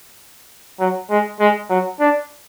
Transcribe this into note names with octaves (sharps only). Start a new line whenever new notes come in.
F#3
G#3
G#3
F#3
D4